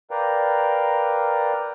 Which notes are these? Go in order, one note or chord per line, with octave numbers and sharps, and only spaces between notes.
A#4 B4 D5 F5 G5 A#5